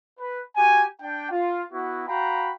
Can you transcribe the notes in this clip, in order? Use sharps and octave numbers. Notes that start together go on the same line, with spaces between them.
B4
F#4 G4 G#5
D4 G5
F4
B3 E4 F#4
F#4 F5 G5 A#5 B5